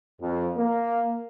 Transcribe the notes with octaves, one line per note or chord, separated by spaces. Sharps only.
F2
A#3